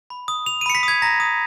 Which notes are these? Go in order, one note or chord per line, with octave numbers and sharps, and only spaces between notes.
B5
D#6
D#6 F7
D#7
B5 C#7
B6
D#6 G#6
A#5 A#6
D#6